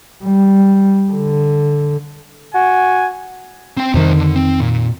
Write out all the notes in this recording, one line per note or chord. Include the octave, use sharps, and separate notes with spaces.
G3
D3
F#4 G#5
C4 G5
C2 F2 D#3 C5
D3
C4
A#2